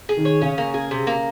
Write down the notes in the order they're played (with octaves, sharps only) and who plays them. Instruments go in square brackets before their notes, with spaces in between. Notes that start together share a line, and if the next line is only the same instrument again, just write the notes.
[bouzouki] G#4
[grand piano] D#3
[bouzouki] C#5
[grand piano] C#3 [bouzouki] C#4
[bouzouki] A#3
G#4
C3
A#3